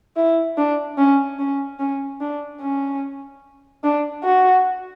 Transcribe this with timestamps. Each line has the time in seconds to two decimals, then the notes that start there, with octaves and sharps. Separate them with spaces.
0.16 E4
0.58 D4
0.98 C#4
1.39 C#4
1.79 C#4
2.21 D4
2.61 C#4
3.84 D4
4.24 F#4